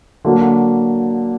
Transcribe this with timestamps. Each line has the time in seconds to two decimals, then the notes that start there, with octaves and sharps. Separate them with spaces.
0.25 D3 F#3 A#3